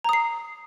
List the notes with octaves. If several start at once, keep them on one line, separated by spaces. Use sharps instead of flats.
A#5 D#6 C7